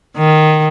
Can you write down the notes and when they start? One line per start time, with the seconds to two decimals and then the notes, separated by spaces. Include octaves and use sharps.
0.17 D#3